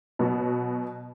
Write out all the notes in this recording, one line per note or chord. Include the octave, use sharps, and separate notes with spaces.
B2 F#3 B3 F#4